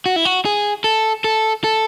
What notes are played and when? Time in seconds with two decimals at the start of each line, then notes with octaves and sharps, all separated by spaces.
0.06 F#4
0.16 E4
0.25 F#4
0.45 G#4
0.84 A4
1.24 A4
1.64 A4